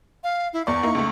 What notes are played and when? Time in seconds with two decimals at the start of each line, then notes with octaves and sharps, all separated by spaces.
0.24 F5
0.53 E4
0.67 E2 D5 C#6
0.83 A#3 D#4 E4
0.95 C#2 A3